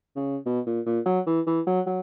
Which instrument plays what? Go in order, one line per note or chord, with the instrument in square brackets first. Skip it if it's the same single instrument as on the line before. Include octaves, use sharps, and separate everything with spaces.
[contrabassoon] C#3
B2
A#2
A#2
F#3
E3
E3
F#3
F#3